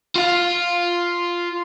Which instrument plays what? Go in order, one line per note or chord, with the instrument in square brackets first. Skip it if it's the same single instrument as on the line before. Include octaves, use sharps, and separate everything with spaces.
[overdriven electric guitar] F4 F5